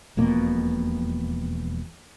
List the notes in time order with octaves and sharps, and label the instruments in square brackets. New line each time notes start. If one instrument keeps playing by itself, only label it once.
[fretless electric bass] E1 F2 B2 A#3